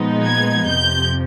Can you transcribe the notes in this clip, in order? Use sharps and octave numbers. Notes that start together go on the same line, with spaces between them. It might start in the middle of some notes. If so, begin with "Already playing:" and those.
Already playing: A#2 F3 G#3 B3 D#4
G#6
F2 C3 F3 G6